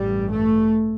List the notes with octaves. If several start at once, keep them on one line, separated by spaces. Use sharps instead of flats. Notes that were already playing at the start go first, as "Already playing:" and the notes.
Already playing: A1 G2 G3
A3